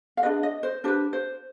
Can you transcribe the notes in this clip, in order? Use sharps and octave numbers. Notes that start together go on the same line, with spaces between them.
F5
D4 G#4 B4 D#5
D#5
C5
D4 G4 B4 C5
C5